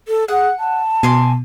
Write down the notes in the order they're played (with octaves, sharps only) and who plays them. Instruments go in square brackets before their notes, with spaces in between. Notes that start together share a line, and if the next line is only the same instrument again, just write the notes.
[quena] A4
[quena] G#4 [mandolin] F#5
[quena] A5
[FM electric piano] B2 [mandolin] G#5 C6 D6